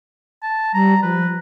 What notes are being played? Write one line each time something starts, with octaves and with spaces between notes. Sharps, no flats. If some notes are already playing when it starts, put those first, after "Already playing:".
A5
G3 A#5
F3 B4